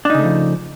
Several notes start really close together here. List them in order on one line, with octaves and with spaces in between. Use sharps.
D4 D#4 C#3 A3 F3